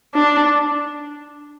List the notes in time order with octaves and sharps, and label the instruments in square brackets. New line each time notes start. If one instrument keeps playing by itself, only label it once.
[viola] D4